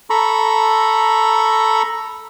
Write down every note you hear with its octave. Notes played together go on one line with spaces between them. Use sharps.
A4 A#5 B5 C#6